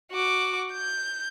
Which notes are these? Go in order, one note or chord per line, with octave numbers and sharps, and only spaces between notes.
F#4 D6
G6